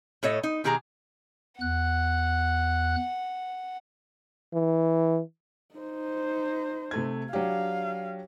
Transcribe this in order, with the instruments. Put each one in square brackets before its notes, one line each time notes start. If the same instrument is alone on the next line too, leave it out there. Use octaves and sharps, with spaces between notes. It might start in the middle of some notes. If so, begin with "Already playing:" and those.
[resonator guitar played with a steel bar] A2 A4 C#5 D#5
D#4
B2 D#3 G4 G#4 A#4 A#5
[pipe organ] E2 F#6 [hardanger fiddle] F#5
[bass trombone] E3
[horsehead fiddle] D#4 C5
[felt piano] C3 A3 G#6
[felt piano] F#3 D4 G4 [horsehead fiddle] F5